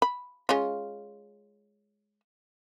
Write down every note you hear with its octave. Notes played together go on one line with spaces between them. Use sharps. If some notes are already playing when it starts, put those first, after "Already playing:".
B5
G#3 C#4 F4